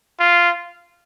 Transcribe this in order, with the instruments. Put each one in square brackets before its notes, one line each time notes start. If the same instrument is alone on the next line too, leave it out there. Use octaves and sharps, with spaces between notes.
[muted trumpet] F4